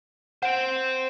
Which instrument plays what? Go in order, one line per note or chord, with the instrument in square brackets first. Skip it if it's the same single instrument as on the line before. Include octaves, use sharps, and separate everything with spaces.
[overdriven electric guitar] C5 G5 [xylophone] F#5